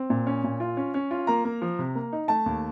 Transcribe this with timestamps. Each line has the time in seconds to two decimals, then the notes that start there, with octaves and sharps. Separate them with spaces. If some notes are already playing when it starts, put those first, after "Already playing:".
Already playing: C4
0.10 A#2
0.27 C#4
0.44 A#2
0.60 F4
0.77 C#4
0.94 C#4
1.11 F4
1.27 A#3 A#5
1.45 A#3
1.62 F3
1.79 C3
1.95 A#3
2.13 D#4
2.28 A3 A5
2.46 D#2